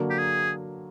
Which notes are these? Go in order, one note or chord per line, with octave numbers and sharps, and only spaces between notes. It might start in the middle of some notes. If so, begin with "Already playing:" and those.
Already playing: D3 F#3 A#3
G4
G#4